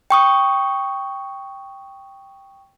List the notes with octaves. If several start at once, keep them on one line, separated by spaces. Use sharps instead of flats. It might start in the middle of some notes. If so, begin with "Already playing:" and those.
G5 C#6 D#6